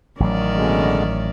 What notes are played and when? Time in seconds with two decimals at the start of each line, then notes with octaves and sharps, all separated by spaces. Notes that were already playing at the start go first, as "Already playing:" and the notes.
0.20 A1 D#3 F#3 C#4 D5
0.56 B2 D3 G#3